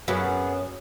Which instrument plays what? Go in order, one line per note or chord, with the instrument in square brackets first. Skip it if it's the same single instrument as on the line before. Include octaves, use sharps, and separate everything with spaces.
[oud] F#2 [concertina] B3 G#4 F#5 [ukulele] F#4 B4